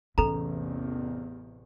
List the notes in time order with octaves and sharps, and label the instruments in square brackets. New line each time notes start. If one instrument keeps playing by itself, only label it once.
[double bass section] A1 E2 C3 [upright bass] E3 C#4 [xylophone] A4 A#5